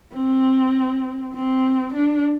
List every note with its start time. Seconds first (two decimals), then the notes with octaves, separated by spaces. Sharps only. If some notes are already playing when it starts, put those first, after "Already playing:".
0.13 C4
1.34 C4
1.94 D4